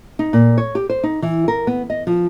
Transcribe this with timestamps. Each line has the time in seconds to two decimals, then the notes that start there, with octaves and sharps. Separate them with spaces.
0.19 D#4
0.33 A#2
0.58 C#5
0.75 G4
0.90 C5
1.04 D#4
1.22 E3
1.48 A#4
1.67 B3
1.90 D#5
2.07 F3